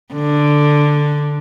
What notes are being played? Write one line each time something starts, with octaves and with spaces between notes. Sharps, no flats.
D3